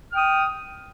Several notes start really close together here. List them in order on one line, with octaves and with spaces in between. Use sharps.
F6 G5 D#6